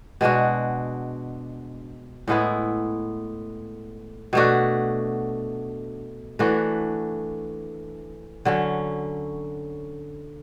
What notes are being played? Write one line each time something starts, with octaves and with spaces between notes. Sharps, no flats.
B2 G#3 D4 F#4
A2 G#3 B3 E4
B2 A3 D4 F#4
E3 A3 D4 F#4
D3 F#3 C#4